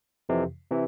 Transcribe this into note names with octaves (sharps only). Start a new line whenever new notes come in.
F2 C3 E3
C3 E3